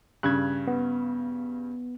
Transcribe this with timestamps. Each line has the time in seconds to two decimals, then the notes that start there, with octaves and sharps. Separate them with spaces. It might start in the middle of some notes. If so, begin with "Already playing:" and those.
0.23 G2 C#3 F#6 G#6
0.67 B3